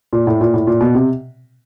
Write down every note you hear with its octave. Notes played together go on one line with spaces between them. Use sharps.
A#2
A2
A#2
A2
A#2
B2
C3